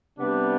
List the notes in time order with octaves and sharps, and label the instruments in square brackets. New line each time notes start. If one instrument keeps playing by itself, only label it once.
[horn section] C3 G3 B3 D4